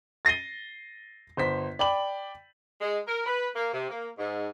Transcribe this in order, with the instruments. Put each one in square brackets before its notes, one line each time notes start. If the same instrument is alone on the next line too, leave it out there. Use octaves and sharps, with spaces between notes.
[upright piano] A6 A#6 C7 D#7 G7
G1 C5 B6
D5 G5 B5 F#7
[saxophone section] G#3
A#4
B4
A#3
C3
A#3
G#2